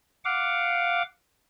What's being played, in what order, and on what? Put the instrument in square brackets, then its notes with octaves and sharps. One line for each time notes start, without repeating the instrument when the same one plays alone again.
[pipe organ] F5 F#5 D6